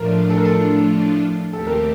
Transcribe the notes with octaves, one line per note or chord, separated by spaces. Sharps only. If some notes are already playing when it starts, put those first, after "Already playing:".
Already playing: A2 F3 A3 D4 F4 A#4
A4
A#4
A4
D#2 D#3 A3 C4 G4 A4
A#4